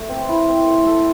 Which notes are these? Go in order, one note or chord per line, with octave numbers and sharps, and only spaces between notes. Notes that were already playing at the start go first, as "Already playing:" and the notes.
Already playing: A3 A4
C4
E4
C4
A3
A4